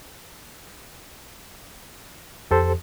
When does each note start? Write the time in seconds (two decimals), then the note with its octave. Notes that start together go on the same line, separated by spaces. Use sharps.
2.51 F2 G4 A4 C5